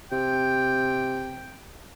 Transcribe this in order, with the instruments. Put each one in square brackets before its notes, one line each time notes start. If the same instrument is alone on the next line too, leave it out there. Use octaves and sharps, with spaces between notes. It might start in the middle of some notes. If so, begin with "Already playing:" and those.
[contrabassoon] C3 [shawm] G5